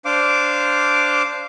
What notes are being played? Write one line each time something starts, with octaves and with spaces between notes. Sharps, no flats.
D4 C5 F5 D6